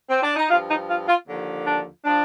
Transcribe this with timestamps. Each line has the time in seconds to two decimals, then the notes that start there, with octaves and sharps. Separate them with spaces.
0.09 C4
0.22 D4
0.36 D#4
0.50 G2 F3 F4
0.70 D#4
0.89 F4
1.08 F4
1.27 D#2 D3 F3
1.65 D4
2.04 F3 D4